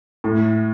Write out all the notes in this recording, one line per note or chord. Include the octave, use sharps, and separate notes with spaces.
A2